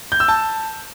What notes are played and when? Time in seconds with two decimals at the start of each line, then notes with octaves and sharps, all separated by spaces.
0.12 G6
0.20 E6
0.28 A5